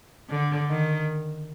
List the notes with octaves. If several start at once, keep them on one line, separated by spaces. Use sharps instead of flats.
D3
D#3